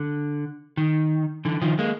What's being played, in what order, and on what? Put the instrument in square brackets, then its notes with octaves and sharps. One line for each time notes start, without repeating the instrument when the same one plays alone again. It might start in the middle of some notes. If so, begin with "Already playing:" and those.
Already playing: [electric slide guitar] D3
D#3
D3 E3
D#3 F3
G#3 A#3